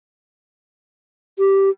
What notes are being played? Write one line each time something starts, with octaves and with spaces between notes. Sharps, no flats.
G4